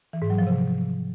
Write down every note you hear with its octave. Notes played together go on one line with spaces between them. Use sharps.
E3
G#2
F#3
F3
C3